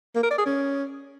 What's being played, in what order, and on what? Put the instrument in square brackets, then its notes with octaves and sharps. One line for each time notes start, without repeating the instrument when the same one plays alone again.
[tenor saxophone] A#3
A#4
D5
G#4
C#4